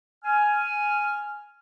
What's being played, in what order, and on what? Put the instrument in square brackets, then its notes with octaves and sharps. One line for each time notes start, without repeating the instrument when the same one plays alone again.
[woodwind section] G#5 F6